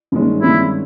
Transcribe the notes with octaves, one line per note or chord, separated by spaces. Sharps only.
G2 D#3 G#3 C#4
G2 D#3 G#3 C#4 E4